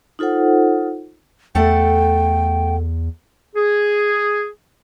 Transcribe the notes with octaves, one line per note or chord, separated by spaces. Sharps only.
D#4 F4 A4 C5 F#5
E2 A3 A4 F#5 G5
G#4